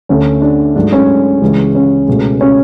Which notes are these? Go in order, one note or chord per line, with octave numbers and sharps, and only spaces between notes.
D2 D3 A3 C#4
D4
G#2 F#3 A3 D4
C#4
C#2 C#3 E3 G#3
C#4
C#2 B2 A3
C#4